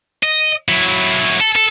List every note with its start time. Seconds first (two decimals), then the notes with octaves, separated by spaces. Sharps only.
0.23 D#5
0.68 F#3 E4
1.40 A4
1.55 A4